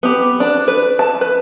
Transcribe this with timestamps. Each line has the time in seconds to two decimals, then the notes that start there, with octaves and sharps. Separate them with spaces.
0.03 B3 G4
0.40 D4
0.68 B4
0.99 A5
1.21 B4